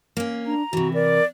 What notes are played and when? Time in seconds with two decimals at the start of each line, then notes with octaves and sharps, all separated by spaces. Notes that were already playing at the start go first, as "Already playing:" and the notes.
0.17 A#3 C#4
0.46 D4 A#5
0.73 C3 E3 F#4
0.94 A#4 D5